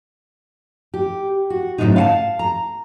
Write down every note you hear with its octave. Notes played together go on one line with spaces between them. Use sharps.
G4
F#4
A2 C#3 F3 F#3 G#3 D#4
F5 F#5 A5
A#5